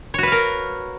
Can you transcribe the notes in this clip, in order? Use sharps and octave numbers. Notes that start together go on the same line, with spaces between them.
F#4 A#4 B4 C#5 F5